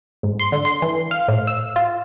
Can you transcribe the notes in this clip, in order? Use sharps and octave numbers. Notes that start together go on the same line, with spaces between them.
G#2
C6
D3
C6
E3
F5
A2
E6
F4